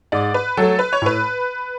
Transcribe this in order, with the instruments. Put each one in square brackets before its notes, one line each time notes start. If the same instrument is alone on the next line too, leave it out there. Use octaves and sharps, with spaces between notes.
[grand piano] G#2 [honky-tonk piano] D5
[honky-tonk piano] B4
[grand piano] F#3 A3 [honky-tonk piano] A4
[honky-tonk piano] B4
C#5
[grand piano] A2 [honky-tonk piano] B4